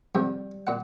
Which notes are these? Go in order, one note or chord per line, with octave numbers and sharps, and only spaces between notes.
G2 C3 F3 G3
A#2 F#5